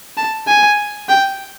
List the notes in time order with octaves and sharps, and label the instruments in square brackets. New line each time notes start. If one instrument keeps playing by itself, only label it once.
[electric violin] A5
G#5
G5